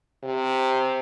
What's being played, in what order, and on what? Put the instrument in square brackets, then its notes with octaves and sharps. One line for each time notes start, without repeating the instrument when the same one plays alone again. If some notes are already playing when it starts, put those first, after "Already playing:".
[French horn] C3